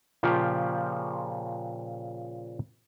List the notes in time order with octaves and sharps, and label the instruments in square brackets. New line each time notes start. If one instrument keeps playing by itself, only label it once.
[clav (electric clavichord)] A#2 C#3 F3 C#4 F4 G4